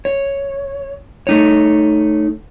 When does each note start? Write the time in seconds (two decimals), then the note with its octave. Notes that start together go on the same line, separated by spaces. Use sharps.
0.05 C#5
1.27 A3 D#4 C#5